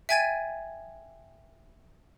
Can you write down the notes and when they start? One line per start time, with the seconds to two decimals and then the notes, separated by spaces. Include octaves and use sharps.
0.09 E5 G5 G#5 G#6 A6 D#7